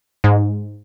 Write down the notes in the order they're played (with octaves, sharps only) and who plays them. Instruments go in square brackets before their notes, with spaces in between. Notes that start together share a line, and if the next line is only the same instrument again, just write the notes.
[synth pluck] G#2